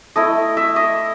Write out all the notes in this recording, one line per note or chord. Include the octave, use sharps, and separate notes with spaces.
A3 E4 D#5
E5
D#5